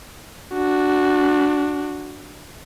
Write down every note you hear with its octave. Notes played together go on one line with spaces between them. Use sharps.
D4 F#4